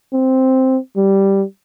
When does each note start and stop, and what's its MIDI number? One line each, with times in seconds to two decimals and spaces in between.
0.13 0.78 60
0.96 1.43 55